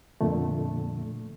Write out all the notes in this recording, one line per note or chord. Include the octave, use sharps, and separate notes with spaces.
F2 A#2 D3 A3